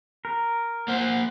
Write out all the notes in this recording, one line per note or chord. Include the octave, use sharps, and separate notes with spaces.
A#4
A#3 C5 F#5